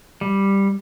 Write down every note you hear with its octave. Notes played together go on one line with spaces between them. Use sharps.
G3